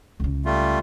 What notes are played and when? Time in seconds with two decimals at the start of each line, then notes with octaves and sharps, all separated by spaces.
0.20 C#2 C#3
0.45 G3 A3 F4